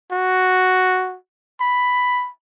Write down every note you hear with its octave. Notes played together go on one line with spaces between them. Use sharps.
F#4
B5